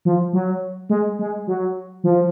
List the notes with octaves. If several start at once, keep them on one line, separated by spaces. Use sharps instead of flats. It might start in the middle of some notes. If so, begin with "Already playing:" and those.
F3
F#3
G#3
G#3
F#3
F3